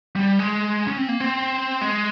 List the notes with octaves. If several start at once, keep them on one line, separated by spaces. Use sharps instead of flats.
G3
G#3
C#4
C4
A#3
C4
G#3